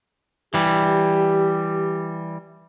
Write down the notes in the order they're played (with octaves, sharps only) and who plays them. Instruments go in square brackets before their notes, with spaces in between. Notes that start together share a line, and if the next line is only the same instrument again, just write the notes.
[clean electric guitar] E3 G3 [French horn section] G4